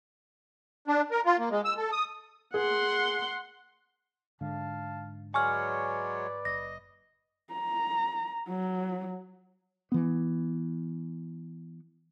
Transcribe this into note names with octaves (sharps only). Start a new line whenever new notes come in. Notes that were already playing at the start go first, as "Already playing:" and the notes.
D4
A#4
F4
A#3
G#3
E6
A4
D#6
G#4 F#5 C6
G#2 D3 F5 A5
F#3 G#3 B4 C#5 D5 G#5 C#6 F6
F#1 D#5 A#6
A#5
F#3
E3 B3